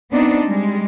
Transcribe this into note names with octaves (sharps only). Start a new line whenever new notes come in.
B3 C4 D4 D#4
G3 G#3